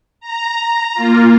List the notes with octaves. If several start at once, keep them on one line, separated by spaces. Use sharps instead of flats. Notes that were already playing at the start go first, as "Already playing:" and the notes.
A#5
A#3 F4